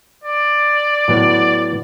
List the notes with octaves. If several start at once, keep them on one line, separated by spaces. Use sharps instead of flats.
D5
A2 F#3 B3